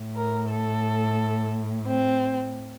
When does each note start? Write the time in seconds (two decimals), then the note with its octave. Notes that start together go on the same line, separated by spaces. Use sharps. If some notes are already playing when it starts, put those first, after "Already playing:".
Already playing: A2
0.16 A#4
0.50 A4
1.87 C4